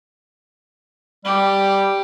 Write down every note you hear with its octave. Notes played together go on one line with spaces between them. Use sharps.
G3 G4